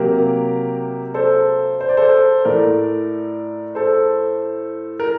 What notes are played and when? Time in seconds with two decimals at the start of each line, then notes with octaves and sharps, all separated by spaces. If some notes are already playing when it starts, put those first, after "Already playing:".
Already playing: C3 F#3 A#3 G4 A#4
1.14 A4 C5
1.81 C5
1.89 D5
1.97 A4 C5
2.45 A2 A3 A#4 D5
3.75 A4 C5
5.00 A#4